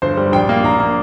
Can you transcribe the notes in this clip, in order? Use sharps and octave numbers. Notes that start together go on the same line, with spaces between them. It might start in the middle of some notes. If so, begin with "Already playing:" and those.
G1 C5
G3
A#1 G5
A#3
A#1 A#5
A#3